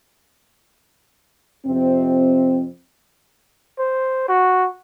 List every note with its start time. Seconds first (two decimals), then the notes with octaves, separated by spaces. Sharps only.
1.66 F2 C3 C4
3.79 C5
4.28 F#4